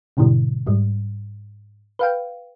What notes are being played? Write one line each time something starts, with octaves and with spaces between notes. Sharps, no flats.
G#2 B2 D3 E3 G3
G#2 G3
B4 F5 G5